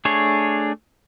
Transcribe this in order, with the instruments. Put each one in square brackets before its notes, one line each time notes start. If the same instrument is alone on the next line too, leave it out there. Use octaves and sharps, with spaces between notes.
[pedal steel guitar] A3 D4 G#4 C#5